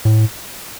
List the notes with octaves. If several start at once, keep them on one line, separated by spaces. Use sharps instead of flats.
A2